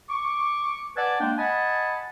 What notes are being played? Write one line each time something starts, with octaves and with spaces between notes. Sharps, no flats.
C#6 D6
B4 D5 F#5 G#5 A5
G#3 A#3 D4 G5
D#5 F#5 G#5 A5 B5